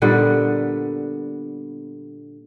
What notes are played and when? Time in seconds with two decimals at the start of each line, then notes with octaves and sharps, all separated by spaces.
0.02 A#2 D3 G3 B3